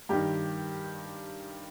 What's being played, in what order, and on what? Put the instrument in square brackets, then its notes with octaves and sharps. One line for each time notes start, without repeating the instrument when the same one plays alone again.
[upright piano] G2 D#3 G4